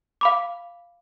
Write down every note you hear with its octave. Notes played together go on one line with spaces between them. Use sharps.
F5 B5 D6